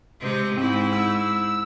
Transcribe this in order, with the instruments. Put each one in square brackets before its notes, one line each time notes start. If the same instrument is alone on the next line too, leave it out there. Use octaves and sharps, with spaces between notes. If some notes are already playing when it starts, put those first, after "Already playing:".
[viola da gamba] C3 G#3 C4
[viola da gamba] G#2 E4 [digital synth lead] C4
[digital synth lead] E6